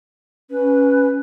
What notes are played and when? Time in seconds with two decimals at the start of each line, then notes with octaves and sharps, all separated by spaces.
0.51 C#4 B4